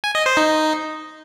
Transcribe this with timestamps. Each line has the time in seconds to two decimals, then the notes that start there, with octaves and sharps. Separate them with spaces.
0.04 G#5
0.15 D#5
0.26 C5
0.37 D#4